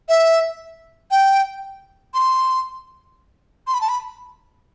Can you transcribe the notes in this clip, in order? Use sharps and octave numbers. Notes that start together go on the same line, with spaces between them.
E5
G5
C6
C6
B5
A5
B5